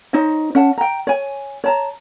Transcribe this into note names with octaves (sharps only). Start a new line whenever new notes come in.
D#4 C5 C#5 D#5
C#4 F#5 A5
G5 A#5
C#5 G#5
C#5 A5 A#5